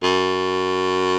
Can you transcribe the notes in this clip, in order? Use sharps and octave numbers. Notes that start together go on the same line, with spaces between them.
F#2